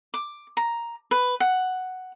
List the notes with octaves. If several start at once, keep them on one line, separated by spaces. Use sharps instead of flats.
D6
A#5
B4
F#5